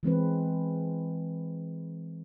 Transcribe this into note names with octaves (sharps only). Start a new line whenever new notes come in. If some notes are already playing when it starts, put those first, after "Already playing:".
E3 G#3 C4 B4